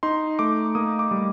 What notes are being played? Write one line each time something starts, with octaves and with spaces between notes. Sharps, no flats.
D#4 C6
A3 D6
A#3 D#6
D6
G3